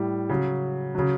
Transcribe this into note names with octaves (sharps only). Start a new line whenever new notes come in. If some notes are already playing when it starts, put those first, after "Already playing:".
Already playing: A2 G3
C#3 F#3
C#3 F#3